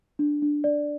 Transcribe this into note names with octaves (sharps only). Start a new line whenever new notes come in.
D4
D4
D5